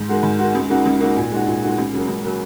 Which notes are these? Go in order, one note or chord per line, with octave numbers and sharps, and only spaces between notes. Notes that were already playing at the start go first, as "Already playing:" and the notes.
Already playing: G#2
D#3 G#3 F#4
G#2
D#3 G#3 F#4
C#2
C#3 A#3 D#4 F#4
C#2
C#3 A#3 D#4 F#4
A#2
G#3 D#4 F#4
A#2
G#3 D#4 F#4
C#2
C#3 F#3 A#3
C#2
C#3 F#3 A#3